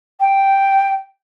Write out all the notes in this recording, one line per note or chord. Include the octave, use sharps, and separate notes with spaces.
G5